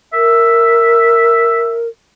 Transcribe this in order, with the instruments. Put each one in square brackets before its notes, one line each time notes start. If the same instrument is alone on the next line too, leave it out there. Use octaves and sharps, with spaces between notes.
[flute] A#4 [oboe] E5